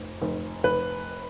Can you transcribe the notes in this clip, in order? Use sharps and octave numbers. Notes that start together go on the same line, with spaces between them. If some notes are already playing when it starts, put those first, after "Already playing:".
Already playing: F1 F2
F1
F1 B4